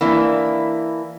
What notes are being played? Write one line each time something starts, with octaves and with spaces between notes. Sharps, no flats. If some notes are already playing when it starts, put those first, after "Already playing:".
E3 A#3 D4 E4